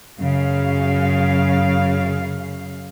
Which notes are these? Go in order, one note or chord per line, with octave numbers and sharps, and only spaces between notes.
F#2 C#3 F5